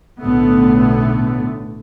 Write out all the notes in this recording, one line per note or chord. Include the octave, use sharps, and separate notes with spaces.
B1 A2 D3 A3 B3